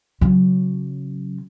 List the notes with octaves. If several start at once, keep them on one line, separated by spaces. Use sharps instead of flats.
C#3 F#3